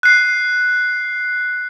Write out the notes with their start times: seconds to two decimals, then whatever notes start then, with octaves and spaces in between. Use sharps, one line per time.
0.03 F#6 C7